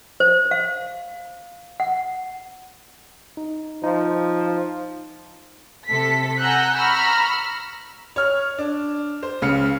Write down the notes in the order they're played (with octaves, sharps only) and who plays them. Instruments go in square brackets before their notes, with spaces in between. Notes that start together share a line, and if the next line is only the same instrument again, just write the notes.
[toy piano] C5
F5
F#5
[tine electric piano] D#4
[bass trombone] F3 [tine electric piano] D#4
[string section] C3 A4 B6
F#5 G#5 A#5 E6 F#6 G6
A#5 B5 C#6 E6 F6
[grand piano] C#5 F6
D4
C5
C#2 C#3 F5 F6 C#7